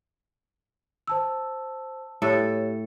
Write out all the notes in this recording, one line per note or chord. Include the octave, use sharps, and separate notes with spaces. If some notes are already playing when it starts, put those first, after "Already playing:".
C5 A5 E6
A2 G4 A4 C#5